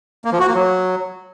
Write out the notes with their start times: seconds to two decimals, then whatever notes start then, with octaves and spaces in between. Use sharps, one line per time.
0.25 A#3
0.32 F3
0.40 F#4
0.47 A#3
0.55 F#3